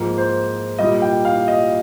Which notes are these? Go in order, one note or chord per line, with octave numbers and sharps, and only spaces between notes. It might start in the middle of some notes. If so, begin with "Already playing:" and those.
Already playing: G#2 F3 A#3
C5
A#2 G3 A#3 D#5
G5
F5
D#5